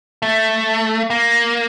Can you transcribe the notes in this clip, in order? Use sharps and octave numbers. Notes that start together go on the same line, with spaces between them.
A3
A#3